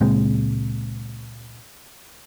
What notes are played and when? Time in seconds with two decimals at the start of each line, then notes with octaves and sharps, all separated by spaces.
0.01 C#2 A#2 G#3 C4